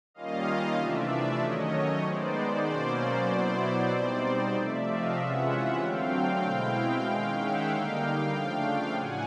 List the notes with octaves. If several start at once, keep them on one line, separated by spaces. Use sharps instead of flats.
D#3 G3 A#3 C#4 F4 D#5 F5
C3 E3 A3 D4 F4 D5 E5
D5 E5
D#3 F#3 A3 C#4 C#5 D#5
D#3 G#3 B3 D#4 C5 D5
B2 F#3 A#3 C#4 C5 D5
B2 F#3 B3 E4
B2 G3 C4 D#4
C3 F3 A3 D5 E5
D#5 F5
C3 E3 G#3 C#4 F4 E5 F#5
D3 F#3 A3 C4 F5 G5
B2 G#3 C4 E4 F5 G5
D#3 G#3 C#4 F5 G5
E5 F#5
D3 G3 A#3 D#4 F5 G5
C#3 F3 A3 D4
A2 F#3 F#5 G#5